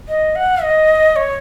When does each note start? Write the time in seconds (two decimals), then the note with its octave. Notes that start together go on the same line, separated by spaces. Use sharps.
0.08 D#5
0.36 F#5
0.62 D#5
1.16 C#5